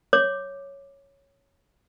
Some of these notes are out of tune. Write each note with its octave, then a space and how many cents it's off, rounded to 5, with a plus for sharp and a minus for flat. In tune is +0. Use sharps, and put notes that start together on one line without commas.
C#5 +0 D6 +10